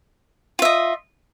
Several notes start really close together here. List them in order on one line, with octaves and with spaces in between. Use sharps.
F4 E5 D#5